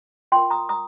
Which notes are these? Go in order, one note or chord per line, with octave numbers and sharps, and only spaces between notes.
F4 A#4 G5 C6
A#5 D#6
A#5 D#6